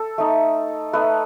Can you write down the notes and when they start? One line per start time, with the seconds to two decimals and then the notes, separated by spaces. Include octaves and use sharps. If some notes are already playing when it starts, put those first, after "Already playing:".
Already playing: A4
0.18 A3 D#4
0.93 A3 D#4 B4